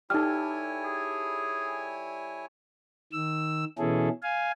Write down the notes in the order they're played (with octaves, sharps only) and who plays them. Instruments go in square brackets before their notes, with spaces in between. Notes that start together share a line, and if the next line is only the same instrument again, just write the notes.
[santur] G3 A4 [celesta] D#4 F6 [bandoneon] E4 C#5 G#5
[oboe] G#4
[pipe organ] D#3 E6
B2 E3 C#4 E4 G#4 A4
F5 G#5